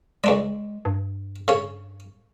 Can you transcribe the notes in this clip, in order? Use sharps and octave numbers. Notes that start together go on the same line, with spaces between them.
C#2 G#3 D4 D5
G2
C#3 C#5